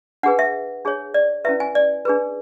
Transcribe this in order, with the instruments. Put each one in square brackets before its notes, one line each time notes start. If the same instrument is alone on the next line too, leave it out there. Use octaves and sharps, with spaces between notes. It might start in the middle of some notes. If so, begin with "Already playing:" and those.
[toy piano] D4 G#4 B4 F#5
E5
D4 G#4 C#5
D5
C#4 E4 B4 E5
G#5
D5
D4 G#4 B4